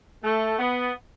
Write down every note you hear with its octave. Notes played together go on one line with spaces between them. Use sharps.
A3
B3